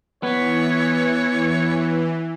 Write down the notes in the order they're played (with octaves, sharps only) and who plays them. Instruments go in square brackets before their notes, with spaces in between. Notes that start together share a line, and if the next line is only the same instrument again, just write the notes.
[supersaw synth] E3 [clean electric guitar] B3 [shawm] C#5